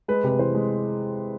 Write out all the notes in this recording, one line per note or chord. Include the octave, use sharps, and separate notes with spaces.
G#3 B4
C3 B4
E3 C5
G#3